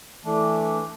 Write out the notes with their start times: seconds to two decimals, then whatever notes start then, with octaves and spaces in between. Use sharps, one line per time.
0.25 E3 A3 D4